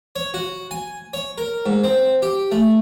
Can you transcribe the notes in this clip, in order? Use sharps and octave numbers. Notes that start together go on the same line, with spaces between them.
C#5
F#4
G#5
C#5
A#4
G#2
C4
G4
A3